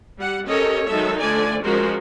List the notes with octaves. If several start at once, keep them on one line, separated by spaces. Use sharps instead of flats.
G3 F#5
C#4 G4 A4 A#4 C#5 D#5
D#3 F#3 G#3 D#4 A4 E5
D3 F3 A3 D5 G#5
F3 G#3 C#4 F#4 A#4 C5